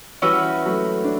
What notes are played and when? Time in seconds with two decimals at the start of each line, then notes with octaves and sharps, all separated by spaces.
0.22 E3 G3 C#4 F#4 B4 E5
0.66 F#3 A3
1.04 D4